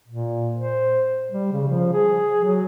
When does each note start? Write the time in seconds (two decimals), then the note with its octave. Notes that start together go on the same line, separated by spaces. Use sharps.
0.08 A#2
0.56 C5
1.31 G3
1.53 C#3
1.68 F3
1.93 G#4
2.45 F#3